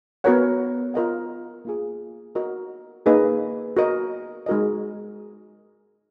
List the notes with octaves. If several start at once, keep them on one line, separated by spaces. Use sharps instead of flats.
B3 F#4 A#4 C#5 F#5
F4 A#4 D#5 F#5
A#3 F4 G#4
F#4 A#4 D#5
A#3 D#4 G#4 B4 D#5
F#4 A#4 D#5
G#3 D#4 F#4 A#4 D#5